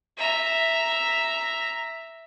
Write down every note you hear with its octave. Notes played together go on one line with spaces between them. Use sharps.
E5 A#5